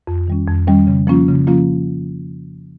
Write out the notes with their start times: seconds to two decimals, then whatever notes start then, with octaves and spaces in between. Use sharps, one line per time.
0.07 F2
0.28 D#3 G3 C#4
0.48 F2
0.67 D#3 G3 C#4
0.87 C#3
1.07 F3 A#3 C#4 F4
1.28 C#3
1.47 F3 A#3 C#4 F4